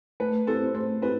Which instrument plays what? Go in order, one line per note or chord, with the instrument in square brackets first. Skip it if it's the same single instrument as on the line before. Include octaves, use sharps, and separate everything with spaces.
[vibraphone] A3 [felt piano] B4
[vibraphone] C4 E4 G4 C5 [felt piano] A4
[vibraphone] A3 [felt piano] C5
[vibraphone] C4 E4 G4 [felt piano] B4